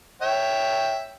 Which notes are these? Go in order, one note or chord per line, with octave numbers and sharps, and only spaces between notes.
C#5 E5 G5